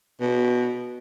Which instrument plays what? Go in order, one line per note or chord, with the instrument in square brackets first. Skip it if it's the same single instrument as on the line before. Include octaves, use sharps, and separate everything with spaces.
[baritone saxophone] B2